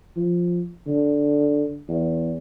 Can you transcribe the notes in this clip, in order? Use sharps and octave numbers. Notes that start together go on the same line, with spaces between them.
F3
D3
E2